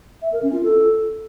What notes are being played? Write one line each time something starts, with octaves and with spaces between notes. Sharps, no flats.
E5
A#4
C#4
F4
A4